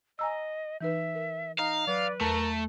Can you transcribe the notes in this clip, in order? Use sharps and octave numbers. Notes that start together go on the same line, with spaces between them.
D#5 G#5 A#5 E6
E3 D#4 B4 E5
A#4
D#4 F5 A#5
F#3 B4 D5
E2 A3 A#4 A5